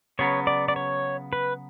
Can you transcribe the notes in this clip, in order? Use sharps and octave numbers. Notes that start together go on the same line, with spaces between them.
C#3 F#3 B3 C#5
D5
D5
C#5
B4